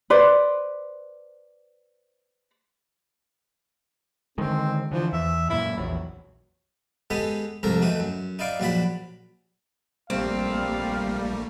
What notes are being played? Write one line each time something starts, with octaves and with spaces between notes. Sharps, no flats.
B4 C5 D5
D3 D#3 G#3 C4
D3 E3 F3
E2 E5
F#2 A#2 E4
A#1 E2 F#3
G#3 B3 G4 A4 B4 D#5
C2 F2 G#2 A4 A#4 A#5
E3 A3 D#4 F#4
F#2
D#4 E4 D5 F5 D6
A#1 F#3 F#4 D5 B5
A#1 G3 A3 A#3 C4 F5